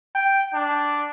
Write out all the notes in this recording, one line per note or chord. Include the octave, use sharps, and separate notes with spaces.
G5
D4